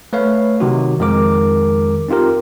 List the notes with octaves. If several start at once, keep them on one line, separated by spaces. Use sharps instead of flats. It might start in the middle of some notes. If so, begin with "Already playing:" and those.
A3 B4 C#5 F5
C3 D#3 F#3 D#4 F#4
F2 D#3 G#3 A#4 D6
C4 D#4 F4 G4 A#4